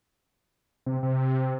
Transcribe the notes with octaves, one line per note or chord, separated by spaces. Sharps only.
C3
C3